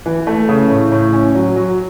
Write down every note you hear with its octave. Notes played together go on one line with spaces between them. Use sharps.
E3
A3
C#3
A2
A2
C#4
F#3
F#3